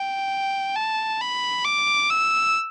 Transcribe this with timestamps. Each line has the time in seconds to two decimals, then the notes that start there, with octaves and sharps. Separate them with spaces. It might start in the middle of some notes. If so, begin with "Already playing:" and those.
Already playing: G5
0.76 A5
1.21 B5
1.65 D6
2.10 E6